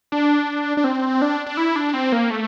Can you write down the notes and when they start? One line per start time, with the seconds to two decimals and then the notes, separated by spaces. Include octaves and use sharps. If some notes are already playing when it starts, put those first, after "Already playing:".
0.12 D4
0.77 D4
0.84 C4
1.22 D4
1.46 D4
1.57 E4
1.76 D4
1.94 C4
2.12 A#3
2.30 A3